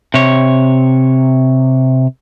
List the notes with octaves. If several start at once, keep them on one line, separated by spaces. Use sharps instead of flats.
C3 C#5